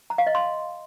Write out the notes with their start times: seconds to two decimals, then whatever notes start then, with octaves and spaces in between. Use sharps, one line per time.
0.10 A#5
0.18 F5
0.27 D#5
0.35 C6